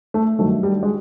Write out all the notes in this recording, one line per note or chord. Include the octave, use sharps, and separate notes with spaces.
A3
G2 D#3 F#3 A3
G3
G#3